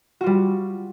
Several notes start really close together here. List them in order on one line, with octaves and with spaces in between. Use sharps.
F#4 F4 G3